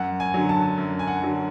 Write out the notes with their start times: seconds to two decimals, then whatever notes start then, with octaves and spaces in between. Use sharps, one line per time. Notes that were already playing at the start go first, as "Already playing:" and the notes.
Already playing: F#2 F#5
0.20 G#5
0.34 D3 F#3
0.49 A5
0.78 F#2
0.99 G#5
1.07 F#5
1.22 D3 F#3